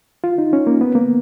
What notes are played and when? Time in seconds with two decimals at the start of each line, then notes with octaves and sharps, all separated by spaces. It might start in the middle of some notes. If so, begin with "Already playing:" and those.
0.24 F4
0.38 D#4
0.53 C#4
0.67 A#3
0.81 B3
0.95 A#3